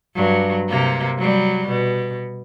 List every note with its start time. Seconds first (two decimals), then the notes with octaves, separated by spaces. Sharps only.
0.15 G2 F#3
0.68 C3 A#3
1.19 F#3 G3
1.68 B2